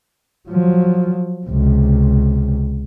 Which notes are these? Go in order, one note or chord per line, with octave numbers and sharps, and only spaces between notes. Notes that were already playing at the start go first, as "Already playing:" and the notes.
F3 F#3
C#2 C3